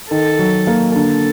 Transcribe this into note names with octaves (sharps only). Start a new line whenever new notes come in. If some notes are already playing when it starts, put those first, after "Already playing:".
D#3 A4
F#3
A#3
D3 A4